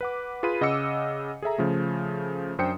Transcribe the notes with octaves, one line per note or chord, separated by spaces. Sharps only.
B4 F#5 D6
F4 G#4 B4 B5 D#7
C#3 D#5 F#5 D6 E6 C#7
G#4 A4 E5 A#5
C#3 F3 A3
F#2 D4 C5 G5 D#6 C#7